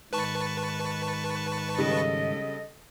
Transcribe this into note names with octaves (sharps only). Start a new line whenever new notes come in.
G#2 D#3 B4 A5 C#6
C#3 G3 A4 D#5